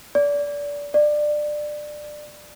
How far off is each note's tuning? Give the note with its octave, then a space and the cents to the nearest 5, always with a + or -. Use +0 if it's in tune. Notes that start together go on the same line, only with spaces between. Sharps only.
D5 -25
D5 +20